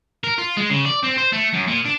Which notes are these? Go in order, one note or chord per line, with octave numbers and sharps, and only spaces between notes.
A#4
F4
G#3
C#3
D5
C4
C5
A3
F#2
A#2
D4